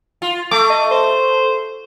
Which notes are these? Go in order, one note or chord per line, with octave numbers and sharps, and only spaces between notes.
F4
A3 D6
D#5
C5